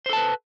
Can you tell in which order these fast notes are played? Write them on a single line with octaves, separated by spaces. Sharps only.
C5 A4 A5 B4